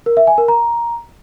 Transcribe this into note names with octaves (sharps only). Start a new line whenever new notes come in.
A#4
E5
G#5
A#4
A#5